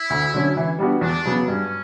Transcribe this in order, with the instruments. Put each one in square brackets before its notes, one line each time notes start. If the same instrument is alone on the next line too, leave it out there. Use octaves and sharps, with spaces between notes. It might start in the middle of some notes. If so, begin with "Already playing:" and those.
Already playing: [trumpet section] E4
[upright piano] D2
D3 F#3 C#4
E3
G3 B3 D4 F#4
[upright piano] E2 [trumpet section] D4
[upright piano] C#3 F#3 B3
[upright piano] G2 [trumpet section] C#4